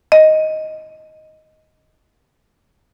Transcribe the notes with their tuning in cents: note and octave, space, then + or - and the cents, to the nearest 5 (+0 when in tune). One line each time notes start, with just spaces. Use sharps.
D#5 +5